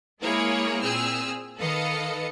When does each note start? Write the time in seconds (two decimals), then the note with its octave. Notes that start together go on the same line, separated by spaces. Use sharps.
0.22 G#3 A#3 E4 G#4 A#4 C#5
0.82 A#2 C4 G#4 E6 F6
1.58 D#3 A4 B4 D#5 F5 C#7